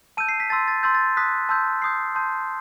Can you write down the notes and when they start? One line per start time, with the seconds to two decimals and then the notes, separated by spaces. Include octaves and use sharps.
0.17 A5 E6 G6 D#7
0.29 C7
0.40 B6
0.50 A5 C6 E6 A6
0.68 A6
0.83 C6 E6 G6 A6
0.95 A6
1.17 A5 D#6 F#6 B6
1.49 A5 C6 E6 G6
1.82 C6 D#6 G6 C7
2.15 A5 C6 D#6 G6